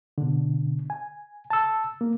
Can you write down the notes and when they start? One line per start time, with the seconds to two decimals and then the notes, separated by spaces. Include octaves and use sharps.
0.18 B2 D3
0.90 G#5
1.50 A5 E6
2.01 A#3